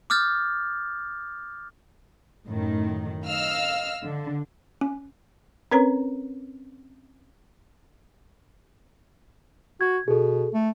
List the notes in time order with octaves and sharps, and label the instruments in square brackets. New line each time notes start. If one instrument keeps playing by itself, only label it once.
[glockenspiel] D6 D#6 F6 G6 A6
[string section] F#2 A2 D#3
D#5 F5 E6 F6
D3
[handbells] C#4
[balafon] C4 C#4 A#4 B4 C#5 A#5
[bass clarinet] F#4 [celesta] G#6
[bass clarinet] B2 [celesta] G#4 A4
[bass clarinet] A3